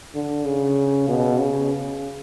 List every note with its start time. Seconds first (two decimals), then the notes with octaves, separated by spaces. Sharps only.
0.14 D3
0.45 C#3
1.08 B2
1.39 C#3